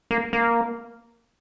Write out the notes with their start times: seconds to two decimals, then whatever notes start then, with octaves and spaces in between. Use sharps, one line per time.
0.11 A#3
0.33 A#3